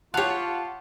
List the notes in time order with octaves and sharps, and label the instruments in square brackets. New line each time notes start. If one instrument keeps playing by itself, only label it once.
[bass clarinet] F4 [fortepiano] G4 F#6 [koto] C#5 F5 [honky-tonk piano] F#5 A5